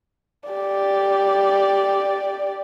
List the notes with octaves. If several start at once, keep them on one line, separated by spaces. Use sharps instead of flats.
G4 D5